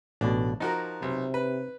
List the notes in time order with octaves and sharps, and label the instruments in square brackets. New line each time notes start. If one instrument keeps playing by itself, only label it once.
[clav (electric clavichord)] A1 B2 [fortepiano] D4
[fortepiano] F3 F#4 A#4 [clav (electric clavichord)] D#4
[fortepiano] B1 [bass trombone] C3
[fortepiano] B4